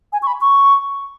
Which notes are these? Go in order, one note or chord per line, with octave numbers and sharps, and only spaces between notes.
G#5
C#6
B5
C#6